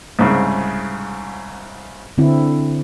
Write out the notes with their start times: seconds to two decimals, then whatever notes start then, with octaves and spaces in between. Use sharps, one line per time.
0.19 C2 G#2 C#3
2.18 D3 C4 E4